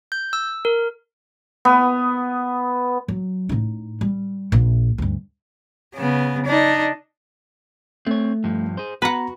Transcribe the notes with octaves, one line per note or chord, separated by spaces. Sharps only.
G6
E6
A#4
B3
F#3
A2 D#4
G3
A#1
D2 G2
C#3 B3
D4 D#4
A3 C4 C#5
G2 F3
G#4 C5
B3 F#4 B4 F#5 A#5